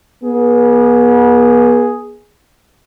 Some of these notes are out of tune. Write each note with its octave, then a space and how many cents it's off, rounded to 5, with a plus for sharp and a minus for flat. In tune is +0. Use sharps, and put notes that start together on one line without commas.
B3 -40 G#4 +0